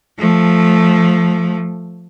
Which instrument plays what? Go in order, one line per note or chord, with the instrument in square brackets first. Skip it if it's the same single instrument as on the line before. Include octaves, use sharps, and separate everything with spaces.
[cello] F3 A3